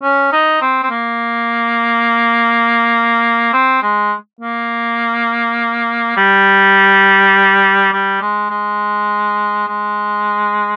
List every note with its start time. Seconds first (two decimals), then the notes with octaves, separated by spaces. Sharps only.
0.03 C#4
0.32 D#4
0.61 C4
0.83 C4
0.90 A#3
3.53 C4
3.82 G#3
4.41 A#3
6.17 G3
7.92 G3
8.22 G#3
8.50 G#3
9.67 G#3